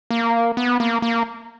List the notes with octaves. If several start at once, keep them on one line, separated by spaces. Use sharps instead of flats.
A#3
B3
A#3
A#3